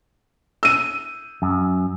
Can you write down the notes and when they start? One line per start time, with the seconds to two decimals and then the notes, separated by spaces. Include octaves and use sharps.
0.63 E6 D#7
1.42 F#2